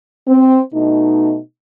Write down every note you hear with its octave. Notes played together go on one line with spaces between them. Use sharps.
C4
B2 A3 D#4